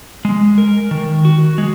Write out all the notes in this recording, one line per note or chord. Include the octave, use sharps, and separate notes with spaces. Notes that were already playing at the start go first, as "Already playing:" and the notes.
G#3
A#4
D#3
F#4
G#3